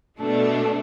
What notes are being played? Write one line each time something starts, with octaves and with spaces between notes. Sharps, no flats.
B2 A3 D4